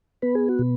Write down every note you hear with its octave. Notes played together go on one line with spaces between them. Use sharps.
B3 B4
G#4
F#4
B2